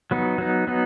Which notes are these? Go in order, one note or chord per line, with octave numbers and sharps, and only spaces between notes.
F#3 B3 D#4
F#3 B3 D#4
F#3 B3 D#4